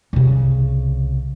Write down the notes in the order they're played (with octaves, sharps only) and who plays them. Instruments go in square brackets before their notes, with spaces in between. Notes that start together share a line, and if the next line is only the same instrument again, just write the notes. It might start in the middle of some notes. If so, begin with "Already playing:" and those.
[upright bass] C2 C#3